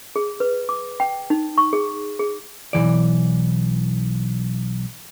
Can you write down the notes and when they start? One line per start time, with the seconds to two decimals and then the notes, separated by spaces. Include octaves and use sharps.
0.16 G#4
0.40 B4
0.69 D6
1.00 G5
1.30 D#4
1.58 C#6
1.73 G#4
2.19 G#4
2.73 B1 A#2 E3 D5